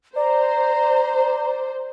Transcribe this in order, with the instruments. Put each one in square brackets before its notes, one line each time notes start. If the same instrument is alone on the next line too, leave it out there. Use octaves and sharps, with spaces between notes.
[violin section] C5 [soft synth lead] D5 [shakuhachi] A#5